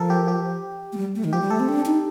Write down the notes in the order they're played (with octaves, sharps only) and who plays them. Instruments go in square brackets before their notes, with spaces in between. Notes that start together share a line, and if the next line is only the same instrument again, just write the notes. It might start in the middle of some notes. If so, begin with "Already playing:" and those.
Already playing: [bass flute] F3 [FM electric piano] A4 A#4
[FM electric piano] G4
G4
[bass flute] A3
G3
A3
D#3
[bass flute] F3 [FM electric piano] G4
[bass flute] G3
[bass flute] A3 [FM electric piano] A4
[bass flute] C4
D4
D#4